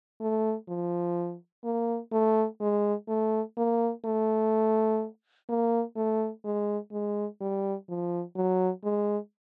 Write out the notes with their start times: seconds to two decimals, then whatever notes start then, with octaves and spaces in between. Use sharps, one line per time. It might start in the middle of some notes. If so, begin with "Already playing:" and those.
0.21 A3
0.68 F3
1.64 A#3
2.12 A3
2.61 G#3
3.08 A3
3.57 A#3
4.05 A3
5.49 A#3
5.96 A3
6.45 G#3
6.92 G#3
7.41 G3
7.89 F3
8.36 F#3
8.84 G#3